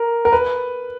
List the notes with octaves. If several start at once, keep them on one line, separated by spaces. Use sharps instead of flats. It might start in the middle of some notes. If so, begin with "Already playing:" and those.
Already playing: A#4
A#4
B4